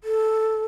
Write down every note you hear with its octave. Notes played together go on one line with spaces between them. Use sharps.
A4